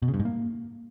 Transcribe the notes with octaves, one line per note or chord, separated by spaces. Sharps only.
B2
C#3
G2
G#2
A#3